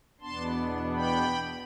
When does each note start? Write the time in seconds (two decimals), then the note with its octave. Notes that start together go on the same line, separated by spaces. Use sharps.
0.21 E2 B2 B3 D4 A5 C6
0.95 G5 B5